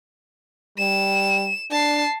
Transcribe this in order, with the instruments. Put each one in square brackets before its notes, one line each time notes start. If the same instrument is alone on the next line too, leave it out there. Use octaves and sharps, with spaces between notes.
[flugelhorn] G3 [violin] E7
[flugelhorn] D4 [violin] A5 C7